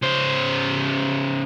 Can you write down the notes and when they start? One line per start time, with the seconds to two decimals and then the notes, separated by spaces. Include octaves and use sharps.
0.02 C#3 C5